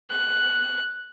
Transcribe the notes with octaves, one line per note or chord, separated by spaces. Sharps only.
F#6